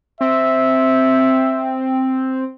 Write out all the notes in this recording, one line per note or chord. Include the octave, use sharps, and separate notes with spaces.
C4 E5